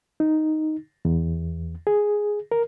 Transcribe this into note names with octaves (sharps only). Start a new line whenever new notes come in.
D#4
E2
G#4
A#4